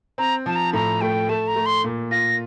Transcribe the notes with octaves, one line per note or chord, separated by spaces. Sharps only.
C4 A#5
F3 A5
A#5
A2 A#5
A3 G5
A3 A5
A#5
A3
C6
A#2
F4 A#6